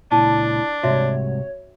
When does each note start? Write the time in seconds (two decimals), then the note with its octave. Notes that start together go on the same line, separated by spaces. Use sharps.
0.12 C#2 A#2 D4 E4 A5
0.83 C2 G#2 C3 F#4 C#5 E5